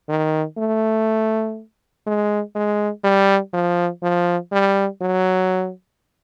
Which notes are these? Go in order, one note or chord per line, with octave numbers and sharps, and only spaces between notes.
D#3
A3
G#3
G#3
G3
F3
F3
G3
F#3